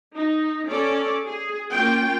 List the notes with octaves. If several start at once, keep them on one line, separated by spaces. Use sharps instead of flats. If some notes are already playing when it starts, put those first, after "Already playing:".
D#4
C#4 A4 D5
G#4
A#3 C#4 F4 G5